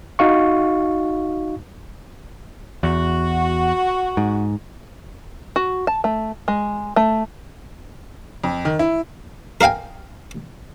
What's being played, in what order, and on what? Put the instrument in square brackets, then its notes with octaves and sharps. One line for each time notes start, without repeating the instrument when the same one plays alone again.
[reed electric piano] D#4 F#4 F5 C#6
[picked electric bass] E2 [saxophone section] F#4
[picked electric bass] G#2
[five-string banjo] F#4
A5
A3
G#3
A3
[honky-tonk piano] F2
D#3
E4
[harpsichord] A#4 D#5 F5 G5 G#5